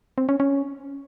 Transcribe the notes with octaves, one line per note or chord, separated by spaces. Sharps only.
C4
C#4
C#4